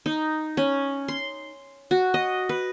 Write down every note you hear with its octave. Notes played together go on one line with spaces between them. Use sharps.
D#4
C#4
C6
F#4
D#5
B4